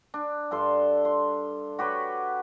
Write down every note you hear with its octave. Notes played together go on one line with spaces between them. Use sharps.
D4
G2 A4 C6
C6
F#4 G4 B4 C#5